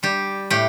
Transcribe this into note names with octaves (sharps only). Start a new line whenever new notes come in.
G3 G4
A2 G4